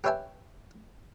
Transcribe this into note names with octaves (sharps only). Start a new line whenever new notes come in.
G4 B4 C#5 E5 G5 G#5